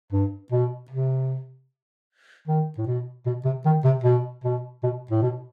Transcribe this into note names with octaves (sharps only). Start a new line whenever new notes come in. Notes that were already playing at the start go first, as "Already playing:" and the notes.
G2
B2
C3
D#3
A2
B2
B2
C3
D#3
C3
B2
B2
B2
A2
B2